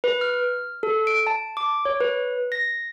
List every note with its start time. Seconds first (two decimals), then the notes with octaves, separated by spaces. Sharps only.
0.04 B4
0.21 F6
0.83 A4
1.07 D7
1.27 A5
1.57 D6
1.85 C#5
2.01 B4
2.52 A#6